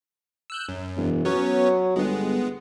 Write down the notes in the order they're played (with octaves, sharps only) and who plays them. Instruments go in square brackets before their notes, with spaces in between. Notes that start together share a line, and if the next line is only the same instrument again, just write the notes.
[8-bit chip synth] E6 F#6 G6
F#2
[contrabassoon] E1
[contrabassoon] F#3 [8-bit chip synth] B3 C#4 C#5
[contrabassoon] G1 [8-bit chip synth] G#3 B3